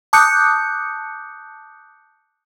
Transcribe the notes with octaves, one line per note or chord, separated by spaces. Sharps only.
A5 D6 D#6 F#6 G6 C#7